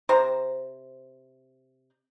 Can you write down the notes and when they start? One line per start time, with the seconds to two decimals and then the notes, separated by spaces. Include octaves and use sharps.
0.09 C3 C5 A#5